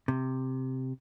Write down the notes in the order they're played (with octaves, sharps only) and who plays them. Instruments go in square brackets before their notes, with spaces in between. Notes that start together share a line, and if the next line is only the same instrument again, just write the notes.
[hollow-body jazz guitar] C3